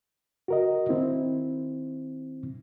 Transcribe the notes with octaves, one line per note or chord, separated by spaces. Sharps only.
F#4 A#4 D#5
D#3 C4 E4